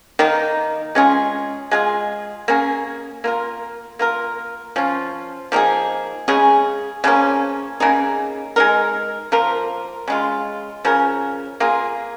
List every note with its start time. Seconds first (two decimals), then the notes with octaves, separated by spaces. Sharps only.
0.19 D#3 A#3 D#4
0.95 G#3 C#4 F4 G#4
1.71 G#3 F4 G#4
2.48 A#3 C#4 G#4
3.24 A#3 F4 A#4
3.99 A#3 F4 A#4
4.76 F3 C#4 F4
5.52 F3 A#3 D#4 G#4
6.28 C#3 G#3 C#4 G#4
7.04 C#3 F3 A#3 C#4
7.80 C#3 A#3 D#4 G#4
8.56 G#3 D#4 A#4
9.32 F3 A#3 F4 A#4
10.08 C#3 G#3 F4
10.85 C#3 F3 C#4 A#4
11.60 A#3 F4 G#4